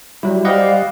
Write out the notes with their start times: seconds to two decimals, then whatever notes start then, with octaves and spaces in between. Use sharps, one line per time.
0.23 F#3 G3 E4
0.45 G4 C5 D5 D#5 F5 F#5